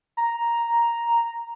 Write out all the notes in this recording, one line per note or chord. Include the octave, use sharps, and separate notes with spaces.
A#5